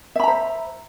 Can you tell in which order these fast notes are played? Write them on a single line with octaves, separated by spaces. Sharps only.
E5 B5 A#5 C5